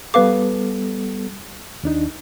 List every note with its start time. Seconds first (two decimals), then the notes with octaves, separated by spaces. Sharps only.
0.14 G3 B3 A4 B4 F5 D6
1.83 D#2 D4 D#4